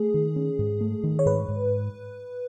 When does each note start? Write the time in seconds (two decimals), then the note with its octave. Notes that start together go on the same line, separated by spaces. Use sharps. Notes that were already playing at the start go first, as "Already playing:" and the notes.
Already playing: A3 G#4
0.14 D#3
0.36 C#4
0.59 G#2
0.81 A3
1.03 D#3
1.19 C#5
1.26 G#2 B4
1.48 G#2